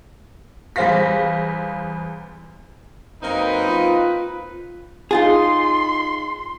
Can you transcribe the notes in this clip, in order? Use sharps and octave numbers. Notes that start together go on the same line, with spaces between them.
E2 G3 C5 F5 A#6 B6
F#2 A#3 C4 D#4 B4
F4
D#4 F4 G#4 C6